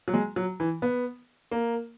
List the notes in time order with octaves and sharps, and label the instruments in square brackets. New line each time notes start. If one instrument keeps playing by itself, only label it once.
[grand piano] F#3
G#3
F#3
E3
B3
A#3